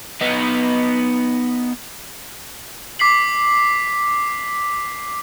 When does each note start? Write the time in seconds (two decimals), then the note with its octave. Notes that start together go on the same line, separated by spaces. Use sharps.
0.21 B3 D#4
2.99 D6 B6 C7 F#7